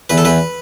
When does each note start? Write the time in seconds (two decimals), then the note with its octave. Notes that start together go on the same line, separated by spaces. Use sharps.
0.10 E2 B4
0.18 A4
0.25 E2 B4